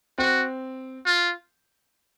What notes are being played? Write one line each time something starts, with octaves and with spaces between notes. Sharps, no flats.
C4 F#4
F4